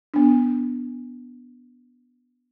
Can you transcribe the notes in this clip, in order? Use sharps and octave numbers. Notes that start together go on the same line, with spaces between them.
B3 D4